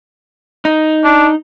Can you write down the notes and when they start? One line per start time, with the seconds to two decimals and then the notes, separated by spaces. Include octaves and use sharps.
0.65 D#4
1.04 D4